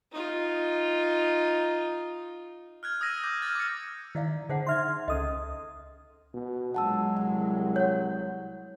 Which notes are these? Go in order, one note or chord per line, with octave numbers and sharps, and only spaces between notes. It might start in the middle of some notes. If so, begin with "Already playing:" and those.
D#4 F4
F6 F#6 G#6
D#6 E6 G#6 A#6 D#7
D6 G6
D6 F6 A6 D#7
D6 C#7
D#3 E4 D5 F5
D3 G#4 C5 F#5
D#4 E5 C6 F6 G#6
C#2 C#4 A4 D#5 D#6
B2
A#1 F#3 G#3 F#5 A5 E6
C2 F#5
C#5 F#5 G6